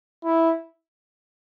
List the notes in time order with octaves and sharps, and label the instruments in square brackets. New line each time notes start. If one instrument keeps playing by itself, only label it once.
[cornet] E4